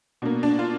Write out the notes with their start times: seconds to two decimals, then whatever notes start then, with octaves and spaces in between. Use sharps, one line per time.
0.22 B2 A#3 D4
0.43 D4
0.59 F4